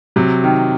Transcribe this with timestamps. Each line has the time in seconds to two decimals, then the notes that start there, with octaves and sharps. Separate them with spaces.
0.16 C3 F#3
0.44 D#3